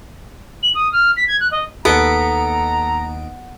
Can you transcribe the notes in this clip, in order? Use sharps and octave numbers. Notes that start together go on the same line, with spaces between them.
F#7
D#6
F6
B6
G#6
F#6
D#5
D#2 B3 A4 D#5 A#5 D7